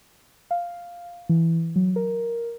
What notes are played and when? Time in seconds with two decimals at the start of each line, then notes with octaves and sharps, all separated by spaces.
0.51 F5
1.29 E3
1.76 F#3
1.96 A#4